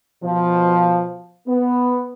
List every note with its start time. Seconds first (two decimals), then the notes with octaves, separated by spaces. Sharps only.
0.24 B2 F3
1.47 B3